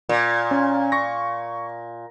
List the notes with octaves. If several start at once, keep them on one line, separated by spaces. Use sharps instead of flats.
A#2
C#4
C#6 A#6